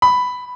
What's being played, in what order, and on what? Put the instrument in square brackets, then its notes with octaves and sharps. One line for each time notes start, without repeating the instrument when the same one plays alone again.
[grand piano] B5